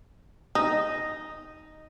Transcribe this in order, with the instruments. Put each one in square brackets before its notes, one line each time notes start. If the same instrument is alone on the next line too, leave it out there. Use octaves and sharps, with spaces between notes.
[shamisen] D#4 [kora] D#5